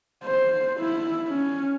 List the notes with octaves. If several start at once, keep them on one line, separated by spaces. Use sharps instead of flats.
C5
E4
C#4